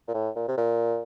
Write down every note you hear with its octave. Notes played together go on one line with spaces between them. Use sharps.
A#2
A2
A#2
C3
A#2